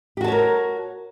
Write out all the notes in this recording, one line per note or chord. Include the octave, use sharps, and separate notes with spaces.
F#4 G4 A#4 C#5 A5